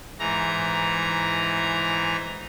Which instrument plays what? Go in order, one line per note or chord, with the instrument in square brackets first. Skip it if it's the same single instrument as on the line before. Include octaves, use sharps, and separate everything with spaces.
[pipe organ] G#2 E3 A#5